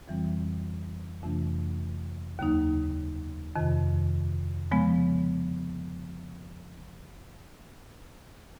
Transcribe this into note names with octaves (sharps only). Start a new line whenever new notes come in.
F2 C#3 E3 G3 C4
F2 C3 E3 A3 D4
D#2 C#3 F#3 A#3 D#4
F2 C3 D#3
C#3 F3 G#3 B3